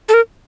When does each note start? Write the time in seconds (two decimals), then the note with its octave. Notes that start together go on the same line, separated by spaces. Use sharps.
0.09 A4
0.14 A#4